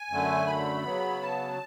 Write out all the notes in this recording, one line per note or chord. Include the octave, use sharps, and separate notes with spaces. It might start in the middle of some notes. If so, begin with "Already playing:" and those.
Already playing: G#5
F#2 D3 A3
B5
C#3 F#3 B3
A5